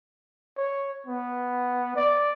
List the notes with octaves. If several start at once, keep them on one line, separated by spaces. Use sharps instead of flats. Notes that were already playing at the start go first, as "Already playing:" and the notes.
C#5
B3
D5